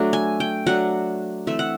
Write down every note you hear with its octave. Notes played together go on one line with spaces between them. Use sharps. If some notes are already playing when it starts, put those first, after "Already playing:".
Already playing: F#3 A3 D4
G#5
G5
F#3 A3 D4 F#5
E3 A3 C4 E5
F#5